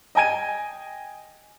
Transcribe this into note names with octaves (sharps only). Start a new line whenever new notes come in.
D#5 G5 G#5 G#6 D#7